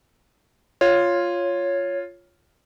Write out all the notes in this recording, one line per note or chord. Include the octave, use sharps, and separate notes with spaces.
F4 C#5